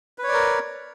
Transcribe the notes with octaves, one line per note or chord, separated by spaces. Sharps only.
A#4 B4 C#5 D5